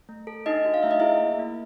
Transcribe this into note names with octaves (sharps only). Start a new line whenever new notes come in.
A3
A4
D4 D#4 D#5
F#4
F5
A3 E5
D#5
E4 G#4 E5
A#3
A#3